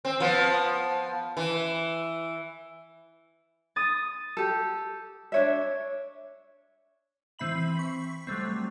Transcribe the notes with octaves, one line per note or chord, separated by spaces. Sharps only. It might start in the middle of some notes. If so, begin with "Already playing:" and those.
C4
F3 B3
E3
D#6 A6
G4 A4
D4 C#5 E5
E3 C4 E5 B5 F#7
C#6 B6
F#3 G3 A3 C4